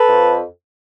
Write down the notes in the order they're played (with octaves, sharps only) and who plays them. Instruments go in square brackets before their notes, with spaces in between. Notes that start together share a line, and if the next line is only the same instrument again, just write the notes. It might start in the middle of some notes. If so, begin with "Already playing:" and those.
Already playing: [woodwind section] A4 B4
F2